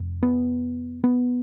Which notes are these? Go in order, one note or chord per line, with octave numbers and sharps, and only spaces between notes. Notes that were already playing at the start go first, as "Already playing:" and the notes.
Already playing: F1 F2
B3
B3